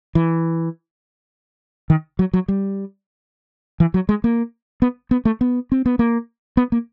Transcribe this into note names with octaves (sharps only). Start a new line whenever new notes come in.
E3
D#3
F#3
F#3
G3
E3
F#3
G#3
A#3
B3
B3
A3
B3
C4
B3
A#3
B3
A#3